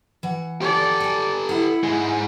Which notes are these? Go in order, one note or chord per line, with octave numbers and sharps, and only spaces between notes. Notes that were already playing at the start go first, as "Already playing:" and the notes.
E3 F#5
G4 A4 D5
G#5 A#5
E4 F#5
G#2 G#3